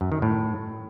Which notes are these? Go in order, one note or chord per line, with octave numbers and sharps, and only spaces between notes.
F#2
D#3
A2